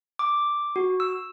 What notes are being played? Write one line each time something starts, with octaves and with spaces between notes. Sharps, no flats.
D6
F#4
E6